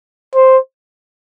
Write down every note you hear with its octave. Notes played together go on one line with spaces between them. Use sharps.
C5